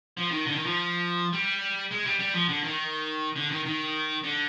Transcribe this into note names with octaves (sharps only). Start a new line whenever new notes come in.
F3
D#3
D3
D#3
F3
G3
G#3
G3
G3
F3
D3
D#3
D3
D#3
D#3
D3